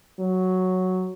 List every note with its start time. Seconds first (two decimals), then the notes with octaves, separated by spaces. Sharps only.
0.19 F#3